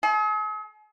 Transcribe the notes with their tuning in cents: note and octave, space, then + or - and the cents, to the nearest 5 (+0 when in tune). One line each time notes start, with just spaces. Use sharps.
G#4 +45